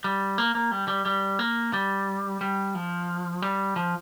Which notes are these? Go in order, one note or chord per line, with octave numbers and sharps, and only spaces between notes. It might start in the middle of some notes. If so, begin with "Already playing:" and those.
G3
A#3
A#3
G3
G3
G3
A#3
G3
G3
F3
G3
F3